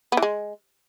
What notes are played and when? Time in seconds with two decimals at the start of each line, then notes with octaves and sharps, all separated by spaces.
0.12 B3
0.17 E3
0.22 G#3